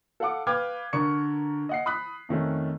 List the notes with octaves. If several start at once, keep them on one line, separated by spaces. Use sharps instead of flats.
A4 F5 F#5 D6
B4 F5 G5 D6 F6 G#6
D3 A#4 D5 C#6 C#7
D#5 F#5 C7
B5 D#6 F#6 B6
F2 D#3 A3 C#4